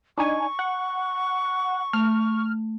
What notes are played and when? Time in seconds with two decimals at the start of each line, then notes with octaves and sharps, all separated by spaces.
0.18 D4 D#4 G#5 C#6
0.59 F#5
1.93 A3 F6